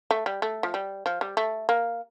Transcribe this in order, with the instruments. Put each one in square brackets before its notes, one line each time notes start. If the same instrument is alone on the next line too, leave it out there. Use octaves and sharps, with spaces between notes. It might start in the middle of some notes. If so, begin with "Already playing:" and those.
[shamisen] A3
G3
A3
F3
G3
F3
G3
A3
A#3